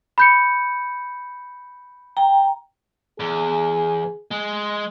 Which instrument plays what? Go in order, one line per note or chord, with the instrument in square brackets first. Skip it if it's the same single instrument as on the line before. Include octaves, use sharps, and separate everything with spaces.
[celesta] B5 G6 C#7
[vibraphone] G5 A#5
[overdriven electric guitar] E2 [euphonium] G#4
[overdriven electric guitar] G#3